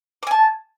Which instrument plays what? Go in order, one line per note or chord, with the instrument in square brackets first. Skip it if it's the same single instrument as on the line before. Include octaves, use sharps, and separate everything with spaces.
[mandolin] D6
G#5
A5